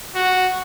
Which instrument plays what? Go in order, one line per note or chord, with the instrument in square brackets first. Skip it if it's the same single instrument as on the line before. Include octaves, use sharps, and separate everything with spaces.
[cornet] F#4